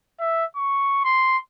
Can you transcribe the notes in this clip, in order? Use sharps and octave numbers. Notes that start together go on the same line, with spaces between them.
E5
C#6
C6